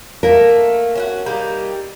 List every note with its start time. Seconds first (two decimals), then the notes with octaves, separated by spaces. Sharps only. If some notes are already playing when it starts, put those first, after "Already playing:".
0.23 A3 A#3 A#4
0.95 C#4 F4 F#4
1.26 G3 A#3 D#4